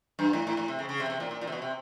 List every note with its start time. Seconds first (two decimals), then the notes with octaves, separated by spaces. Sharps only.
0.19 G2
0.33 A2
0.47 A2
0.57 A2
0.68 C3
0.79 C#3
0.89 C#3
1.00 C3
1.10 C3
1.20 A#2
1.31 A#2
1.41 A#2
1.47 C3
1.52 B2
1.62 C3